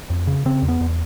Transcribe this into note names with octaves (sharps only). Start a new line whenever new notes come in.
F2
C#3
C#3 C4
E2
B3
E2